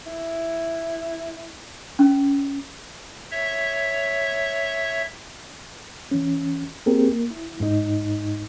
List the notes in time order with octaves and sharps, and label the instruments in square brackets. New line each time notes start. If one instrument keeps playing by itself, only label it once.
[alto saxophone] E4
[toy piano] C#4
[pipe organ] C#5 E5
[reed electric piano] E3 C#4
A#3 C4 G4 G#4 A#4
A#3
E4
G#2 D#4